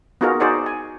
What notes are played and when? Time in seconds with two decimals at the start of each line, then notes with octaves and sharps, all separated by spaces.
0.21 B3 D#4 F4 F#4 G#4 A#4
0.40 D#4 F#4 G#4 C5 D5 F#5
0.66 G#5